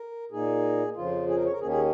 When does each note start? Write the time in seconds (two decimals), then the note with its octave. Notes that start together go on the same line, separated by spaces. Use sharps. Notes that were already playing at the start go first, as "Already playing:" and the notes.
Already playing: A#4
0.31 A#2 A#3 D#4 G#4
0.96 F2 C#3 F3 F4
1.28 G#4
1.36 A#4
1.45 C#5
1.52 A#4
1.61 D#2 D#3 A#3 C#4 G#4
1.71 G#4